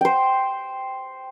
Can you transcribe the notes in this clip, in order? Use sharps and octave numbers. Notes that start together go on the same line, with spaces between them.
C5 G5